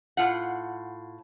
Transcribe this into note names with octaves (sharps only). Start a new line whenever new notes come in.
A2 F4 F#5